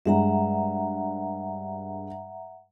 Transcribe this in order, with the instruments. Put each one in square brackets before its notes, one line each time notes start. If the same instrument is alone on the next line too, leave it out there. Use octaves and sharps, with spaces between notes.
[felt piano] G2 G#3 [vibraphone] E5 F#5 A#5